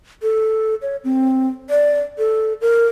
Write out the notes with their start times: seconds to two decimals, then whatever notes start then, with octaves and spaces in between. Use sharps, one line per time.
0.22 A4
0.82 C#5
1.04 C4
1.70 D5
2.18 A4
2.61 A#4